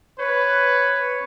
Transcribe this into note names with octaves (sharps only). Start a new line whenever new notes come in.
B4 C#5